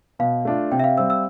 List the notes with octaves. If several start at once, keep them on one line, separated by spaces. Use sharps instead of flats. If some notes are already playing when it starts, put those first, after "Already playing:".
B2 F5
A3 D4 F4
C3 G5
E5
F5
G3 C4 E6
E6